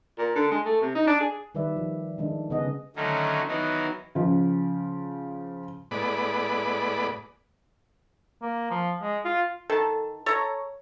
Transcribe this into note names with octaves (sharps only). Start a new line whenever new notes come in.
A#2
D3
G#3
A3
C3
D#4
D4
G#4
D#3 G3 B4 D5 E5
F3
D#3 G#3 D4
C#3 B3 G#4 D#5 F#5
D3 D#3 F#3 A3 C#4 D#4
D#3 E3 F#3 B3 D#4
C#3 F3
A2 G#3 B3 D5 B5
A#3
F3
G#3
F4
D#3 A4 A5
A4 C#5 A#5